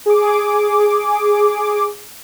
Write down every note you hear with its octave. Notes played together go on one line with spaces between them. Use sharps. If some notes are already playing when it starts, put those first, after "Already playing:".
G#4 D6